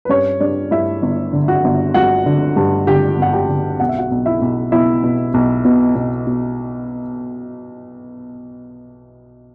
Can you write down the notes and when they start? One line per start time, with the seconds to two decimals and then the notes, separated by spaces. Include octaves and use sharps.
0.05 B4
0.09 G2 C#4 C#5
0.40 G2 D4 D5
0.71 G2 E4 E5
1.02 G1
1.33 D3
1.48 F#4 F#5
1.64 G1
1.94 G2 F#4 F#5
2.26 D3
2.56 G2
2.87 D3 G4 G5
3.18 G1 F#5
3.33 G4 G5
3.49 D3
3.80 B1 F#5
3.89 E5
3.98 F#4 F#5
4.11 B1
4.26 E4 E5
4.42 B1
4.72 B2 E4 E5
5.04 B2
5.34 B1
5.65 B2
5.95 B2
6.27 B2